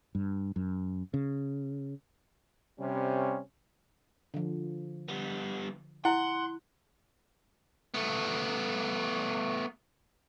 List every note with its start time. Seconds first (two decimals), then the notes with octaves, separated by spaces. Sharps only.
0.15 G2
0.56 F#2
1.14 C#3
2.79 C3 G3 C#4
4.34 D3 F3
5.09 G3 B3
6.05 E4 F#5 C6
7.94 A3 B3